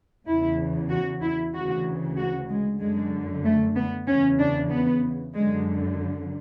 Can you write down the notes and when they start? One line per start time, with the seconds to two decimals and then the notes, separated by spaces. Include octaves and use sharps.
0.27 E2 C#3 E3 E4
0.90 F#4
1.21 E4
1.54 D2 C#3 E3 F#4
2.18 F#4
2.49 G#3
2.80 F#2 D3 G#3
3.44 A3
3.76 B3
4.07 E2 C#3 E3 C#4
4.39 D4
4.71 B3
5.34 F#2 D3 G#3